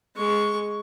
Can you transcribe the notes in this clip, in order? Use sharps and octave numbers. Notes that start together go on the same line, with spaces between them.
G#3 C#6